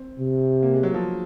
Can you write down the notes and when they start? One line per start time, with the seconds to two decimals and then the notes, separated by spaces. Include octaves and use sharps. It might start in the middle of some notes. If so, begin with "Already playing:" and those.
Already playing: C4
0.19 C3
0.62 A#3
0.73 G#3
0.83 F#3
0.94 F3